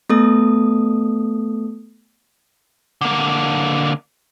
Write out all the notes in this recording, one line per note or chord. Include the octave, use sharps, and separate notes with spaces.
A3 B3 A4 D#6
D3 A#3